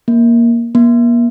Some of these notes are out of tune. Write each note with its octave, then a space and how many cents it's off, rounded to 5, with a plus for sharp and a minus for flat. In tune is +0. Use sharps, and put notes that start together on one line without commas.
A#3 +5
A#3 +35